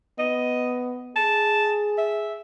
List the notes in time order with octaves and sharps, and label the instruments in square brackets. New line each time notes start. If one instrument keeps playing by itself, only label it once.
[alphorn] B3 [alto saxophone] D#5
[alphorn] G#4 [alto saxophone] A5
[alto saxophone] E5